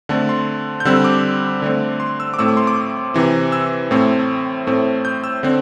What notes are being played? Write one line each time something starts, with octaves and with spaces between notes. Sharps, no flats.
D3 A3 C4 A5
C6
G6
D3 G3 C4 E6
D6
D3 A3 C4
C6
E6
D6
A2 A3 C4 E6
D6
C6
D6
C3 E3 C4
E6
A2 A3 C4
A2 A3 C4
G6
E6
D3 C4